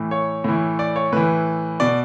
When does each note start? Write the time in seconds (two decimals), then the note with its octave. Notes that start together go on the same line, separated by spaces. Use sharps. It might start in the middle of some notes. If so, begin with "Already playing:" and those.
Already playing: A2 E3
0.11 C#5
0.44 A2 E3
0.79 D5
0.96 C#5
1.12 A2 E3 B4
1.80 B2 D5